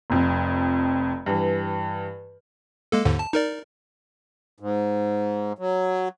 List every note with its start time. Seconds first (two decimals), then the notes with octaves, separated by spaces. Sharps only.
0.10 F1 F2
1.26 G2 E3
2.92 G#3 A#3 A4
3.05 D#2 G#2 D3
3.19 A5
3.33 D#4 A#4 D5
4.60 G#2
5.59 F#3